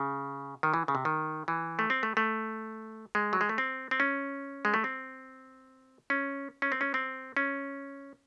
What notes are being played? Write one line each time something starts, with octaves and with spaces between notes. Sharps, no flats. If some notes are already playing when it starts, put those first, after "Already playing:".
Already playing: C#3
D#3
E3
C#3
C3
D#3
E3
A3
C4
A3
A3
G#3
F#3
G#3
A3
C4
C4
C#4
G#3
A3
C4
C#4
C#4
C4
C#4
C4
C#4